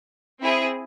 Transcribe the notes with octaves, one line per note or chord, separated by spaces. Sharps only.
C4 E4 G#4